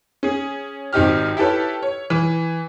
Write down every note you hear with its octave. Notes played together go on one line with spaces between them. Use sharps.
C#4 G#4
G#1 C4 D#4 G4 F6
E4 G4 A4 B4 C#5
C#5
E3